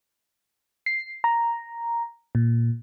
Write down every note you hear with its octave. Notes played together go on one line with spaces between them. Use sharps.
C7
A#5
A#2